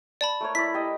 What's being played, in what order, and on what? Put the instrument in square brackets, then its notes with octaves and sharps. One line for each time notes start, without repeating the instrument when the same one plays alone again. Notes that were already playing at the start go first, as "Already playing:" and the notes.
[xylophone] D5 A5 B5
[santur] A3 A#4 C#5
[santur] E4 D5 [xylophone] B6
[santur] G4 D#5